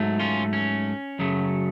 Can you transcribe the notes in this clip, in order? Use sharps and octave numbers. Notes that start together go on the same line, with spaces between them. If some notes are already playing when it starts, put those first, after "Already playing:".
Already playing: G#2 F#3 A3
C#4 F4
C#4
F#2 C#3 F#3 A3